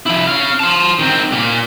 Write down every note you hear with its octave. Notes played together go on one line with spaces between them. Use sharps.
F3 E4
C#4 F5
C5 A5
D#3 C4
A#2 A#3